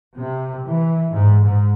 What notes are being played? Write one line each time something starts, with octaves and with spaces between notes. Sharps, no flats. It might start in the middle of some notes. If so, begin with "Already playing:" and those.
C3
E3
G#2
G#2